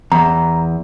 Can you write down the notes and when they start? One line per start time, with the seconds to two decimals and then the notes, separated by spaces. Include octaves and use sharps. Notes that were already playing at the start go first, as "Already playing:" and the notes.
0.12 E2 A#5